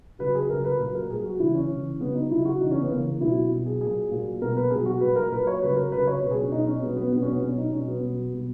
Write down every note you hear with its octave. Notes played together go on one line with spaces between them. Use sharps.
C#3 F#3 B4
G#4
C#3 F#3 A#4
B4
A#2 F#3 B4
A#4
A#2 F#3 G#4
F#4
C#3 E3 E4
C#4
C#3 E3
C#3 F#3 B3
D#4
C#3 F#3 E4
F#4
C#3 E3 D#4
C#4
B3
C#3 E3 A#3
B2 F#3 E4
B2 F#3
G#4
A#2 F#3 G#4
A#2 F#3
B2 F#3 A#4
B4
B2 F#3 G#4
F#4
A#2 F#3 B4
A#4
A#2 F#3 B4
C#5
C#3 F#3 B4
A#4
C#3 F#3 B4
C#5
B2 F#3 B4
G#4
C#4
B2 F#3 D#4
C#4
B2 F#3 B3
B3
B2 F#3 B3
C#4
B3
B2 F#3 C#4
D#4
B2 F#3 C#4
B3
B2 F#3
B2 F#3